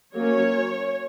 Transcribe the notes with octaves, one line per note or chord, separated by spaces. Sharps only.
F#3 A#3 C#4 C#5